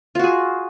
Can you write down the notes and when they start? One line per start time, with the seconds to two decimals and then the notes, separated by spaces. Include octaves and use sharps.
0.15 F4
0.19 F#4
0.24 G#4